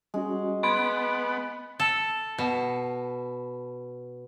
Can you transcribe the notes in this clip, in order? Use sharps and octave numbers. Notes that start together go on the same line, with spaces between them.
G3 G#3 C#4 F#4
B3 G#5 B5 C6 F#6 D7
A4
B2